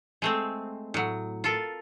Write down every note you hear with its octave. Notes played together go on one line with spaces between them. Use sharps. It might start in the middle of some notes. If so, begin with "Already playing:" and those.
G#3 A3 C4
A2 F#3
F4 A4 A#4